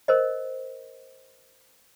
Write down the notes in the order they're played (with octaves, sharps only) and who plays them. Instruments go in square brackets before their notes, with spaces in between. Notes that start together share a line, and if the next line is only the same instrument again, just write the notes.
[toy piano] A#4 C5 D#5